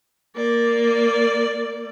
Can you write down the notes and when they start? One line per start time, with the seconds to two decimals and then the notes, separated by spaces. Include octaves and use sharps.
0.36 A#3 D5